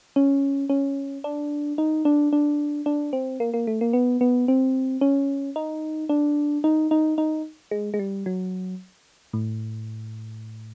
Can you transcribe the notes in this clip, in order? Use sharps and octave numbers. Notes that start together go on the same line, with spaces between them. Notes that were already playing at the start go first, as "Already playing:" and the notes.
C#4
C#4
D4
D#4
D4
D4
D4
C4
A#3
A#3
A3
A#3
B3
B3
C4
C#4
D#4
D4
D#4
D#4
D#4
G#3
G#3
G3
F#3
A2